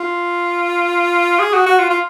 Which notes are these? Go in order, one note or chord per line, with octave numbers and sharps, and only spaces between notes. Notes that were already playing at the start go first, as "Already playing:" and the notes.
Already playing: F4
G#4
F#4
F#4
F4
F4